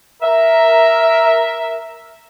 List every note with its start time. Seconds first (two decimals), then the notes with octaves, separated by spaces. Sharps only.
0.22 A#4 E5